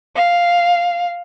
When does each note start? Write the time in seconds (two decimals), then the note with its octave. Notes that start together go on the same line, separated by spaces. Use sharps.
0.16 F5